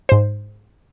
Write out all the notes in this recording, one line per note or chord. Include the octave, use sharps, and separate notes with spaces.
G#2 C5